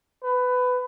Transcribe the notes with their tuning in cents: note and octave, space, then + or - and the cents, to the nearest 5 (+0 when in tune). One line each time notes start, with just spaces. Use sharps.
B4 +20